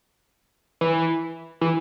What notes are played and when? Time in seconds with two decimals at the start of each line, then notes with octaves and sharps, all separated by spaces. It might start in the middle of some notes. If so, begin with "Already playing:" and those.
0.81 E3
1.61 E3